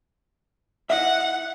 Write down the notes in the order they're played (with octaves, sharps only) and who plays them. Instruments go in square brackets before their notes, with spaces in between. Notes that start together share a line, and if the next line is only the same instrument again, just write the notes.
[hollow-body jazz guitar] E4 D#5 E5 [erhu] F#5